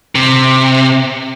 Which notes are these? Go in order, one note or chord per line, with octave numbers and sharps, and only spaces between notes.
C3